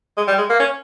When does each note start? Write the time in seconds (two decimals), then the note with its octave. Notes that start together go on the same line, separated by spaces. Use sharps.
0.17 G#3
0.27 G3
0.38 G#3
0.50 A#3
0.60 C#4